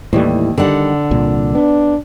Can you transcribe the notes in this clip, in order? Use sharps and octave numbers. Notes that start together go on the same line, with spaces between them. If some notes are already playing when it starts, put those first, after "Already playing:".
D#2 A2 E3 G3
D3 D#3 G3 F#5
C2 A#2
B3 D4